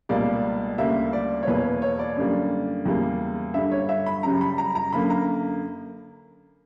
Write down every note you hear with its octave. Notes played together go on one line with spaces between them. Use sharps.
C#2 B2 G3 A#3 D5
D2 C#3 G3 A#3 E5
D5
C#5
E2 B2 A#3 B4
C#5
B4
C#5
D5
F#2 D3 G3 A#3
E2 C#3 G3 A#3
G2 D3 G3 E5
C#5
E5
B5
F#2 C#3 G3 A#5
B5
A#5
A#5
F#2 D3 A#3 B5
A#5